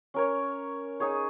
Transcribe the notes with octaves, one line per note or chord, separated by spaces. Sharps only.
C#4 A#4 C#5
D#4 G#4 C#5